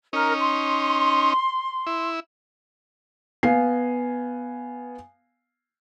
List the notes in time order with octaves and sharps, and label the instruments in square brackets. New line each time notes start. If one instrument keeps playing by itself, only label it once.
[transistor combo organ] C#4 D#4 [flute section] A#4
[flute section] C6
[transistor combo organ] E4
[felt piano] B3 F5 G#5 C7